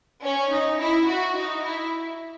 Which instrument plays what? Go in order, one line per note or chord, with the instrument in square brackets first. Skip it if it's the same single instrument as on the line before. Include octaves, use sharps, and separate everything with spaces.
[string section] C#4
D#4
E4
F#4
D#4
E4